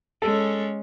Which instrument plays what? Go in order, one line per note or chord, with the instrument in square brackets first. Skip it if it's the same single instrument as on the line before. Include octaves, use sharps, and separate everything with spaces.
[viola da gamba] G#3 C#4 [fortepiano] A4